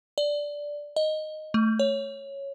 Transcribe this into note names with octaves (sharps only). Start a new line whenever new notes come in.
D5
D#5
A3
C#5